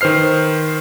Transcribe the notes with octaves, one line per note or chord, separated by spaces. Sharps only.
D#3 B4 C5 F6 C7